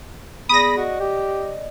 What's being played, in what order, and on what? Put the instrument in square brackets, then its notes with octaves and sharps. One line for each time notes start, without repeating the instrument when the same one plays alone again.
[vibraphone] B3 G#4 D5 [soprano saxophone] B5 [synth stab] D#6 A#6
[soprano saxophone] F#4 [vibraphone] D5 D#5
[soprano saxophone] G4